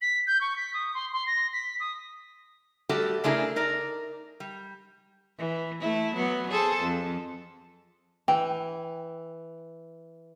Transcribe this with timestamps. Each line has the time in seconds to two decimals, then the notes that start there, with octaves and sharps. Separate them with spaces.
0.01 B6
0.27 G6
0.41 C#6
0.56 B6
0.74 D#6
0.94 C6
1.12 C6
1.27 A#6
1.53 B6
1.80 D#6
2.89 G3 A3 F#4 G4 A4
3.24 C#3 A3 D4 E4 G#4 A#4
3.56 D#4 A#4 D5
4.40 G3
5.38 E3
5.80 A3 E4
6.14 F#3 B3
6.50 G#4 A4 C5
6.81 F2
8.28 E3 G5